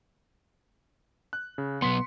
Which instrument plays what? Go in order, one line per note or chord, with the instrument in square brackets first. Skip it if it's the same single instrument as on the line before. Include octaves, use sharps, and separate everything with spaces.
[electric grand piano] F#6
C#3
[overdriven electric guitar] B1 B3 [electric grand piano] C6 B6 C#7